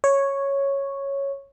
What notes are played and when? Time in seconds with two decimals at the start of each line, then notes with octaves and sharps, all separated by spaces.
0.04 C#5